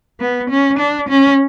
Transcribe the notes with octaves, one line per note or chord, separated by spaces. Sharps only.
B3
C#4
D4
C#4